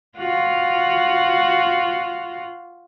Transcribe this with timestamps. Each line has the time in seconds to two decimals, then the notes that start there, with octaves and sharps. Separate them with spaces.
0.18 F4 F#4